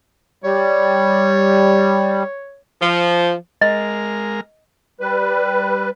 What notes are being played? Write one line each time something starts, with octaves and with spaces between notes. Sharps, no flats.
G3 C#5
F3
G#3 A#4 D#5 F6
G3 B4